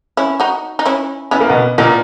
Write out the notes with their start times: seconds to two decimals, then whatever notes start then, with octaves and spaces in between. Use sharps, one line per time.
0.17 C#4 E4
0.40 D#4 F#4
0.79 D#4
0.86 C#4 E4
1.31 B3 C#4 E4
1.41 A#3
1.49 B2 B3
1.78 A#2 A#3 B3 D#4